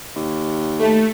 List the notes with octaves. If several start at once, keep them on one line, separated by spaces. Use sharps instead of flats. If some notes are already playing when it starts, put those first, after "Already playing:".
D#2
A3